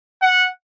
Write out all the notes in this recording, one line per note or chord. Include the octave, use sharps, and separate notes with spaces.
F#5